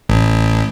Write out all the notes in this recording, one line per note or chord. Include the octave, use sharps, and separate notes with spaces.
A1